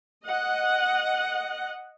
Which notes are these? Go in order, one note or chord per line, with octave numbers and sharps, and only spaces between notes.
D#5 F#5